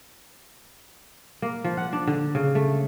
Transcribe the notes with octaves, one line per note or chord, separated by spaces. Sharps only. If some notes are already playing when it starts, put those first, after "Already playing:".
A#3
F3
F#5
D4
D3
C#3
A3